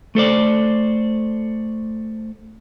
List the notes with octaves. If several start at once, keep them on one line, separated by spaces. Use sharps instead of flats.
A3 A4 C5 D5